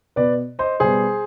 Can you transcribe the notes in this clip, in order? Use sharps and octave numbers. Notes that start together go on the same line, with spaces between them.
B2 B3 B4 D5
C5 D#5
B2 G3 B3 G#4 C5